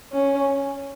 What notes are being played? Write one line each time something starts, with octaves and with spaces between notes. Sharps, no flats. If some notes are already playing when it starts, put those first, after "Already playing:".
C#4